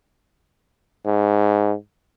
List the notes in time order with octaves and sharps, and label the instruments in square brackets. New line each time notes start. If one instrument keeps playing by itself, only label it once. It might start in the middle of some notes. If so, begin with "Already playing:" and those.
[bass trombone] G#2